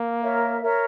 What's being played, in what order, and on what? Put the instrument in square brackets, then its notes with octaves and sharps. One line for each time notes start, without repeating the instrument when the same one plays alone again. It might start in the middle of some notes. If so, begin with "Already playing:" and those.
Already playing: [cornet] A#3
[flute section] A#4 C#5 E5
A#4 C#5 E5